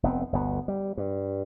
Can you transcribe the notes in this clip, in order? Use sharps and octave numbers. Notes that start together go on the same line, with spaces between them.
F1 B3 C4
G1 D2 B3
G3
G2